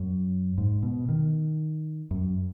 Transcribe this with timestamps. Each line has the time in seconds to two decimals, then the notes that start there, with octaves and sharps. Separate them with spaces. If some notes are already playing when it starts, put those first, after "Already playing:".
Already playing: F#2
0.58 G#2
0.83 B2
1.09 D#3
2.11 F#2